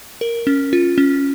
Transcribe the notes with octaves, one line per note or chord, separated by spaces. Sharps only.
A#4
C#4
F4
C#4